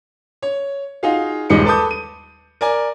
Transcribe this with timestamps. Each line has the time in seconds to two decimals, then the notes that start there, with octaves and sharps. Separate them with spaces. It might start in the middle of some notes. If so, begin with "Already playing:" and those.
0.42 C#5
1.03 D#4 F4 F#4 G#4 F5
1.50 D#1 D#2 G3 G#3 D#4 C#7
1.65 A4 B4 A5 D6 D#6 G6
1.91 D#7
2.61 A#4 D5 G#5